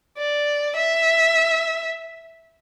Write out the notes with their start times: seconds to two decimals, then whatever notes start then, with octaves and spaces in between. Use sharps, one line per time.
0.18 D5
0.76 E5